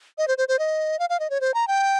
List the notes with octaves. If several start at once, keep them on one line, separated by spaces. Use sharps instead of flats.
D#5
C5
C5
C5
D#5
F5
F5
D#5
C#5
C5
A#5
G5